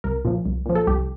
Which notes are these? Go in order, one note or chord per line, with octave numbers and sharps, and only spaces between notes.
C2 A#4
A#2 F3
C2
A#2 F3
A4
C2 G4